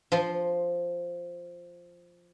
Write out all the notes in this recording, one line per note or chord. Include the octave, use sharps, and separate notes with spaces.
F3 C6